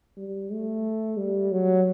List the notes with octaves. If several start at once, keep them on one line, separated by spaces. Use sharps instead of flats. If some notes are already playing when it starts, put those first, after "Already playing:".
G3
A3
G3
F#3